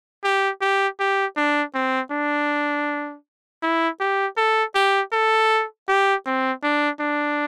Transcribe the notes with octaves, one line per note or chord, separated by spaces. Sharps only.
G4
G4
G4
D4
C4
D4
E4
G4
A4
G4
A4
G4
C4
D4
D4